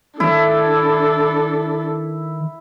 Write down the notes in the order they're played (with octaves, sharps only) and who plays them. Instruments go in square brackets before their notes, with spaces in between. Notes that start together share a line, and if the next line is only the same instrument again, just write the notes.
[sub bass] D#3 [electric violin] D4 A4 [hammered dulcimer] E4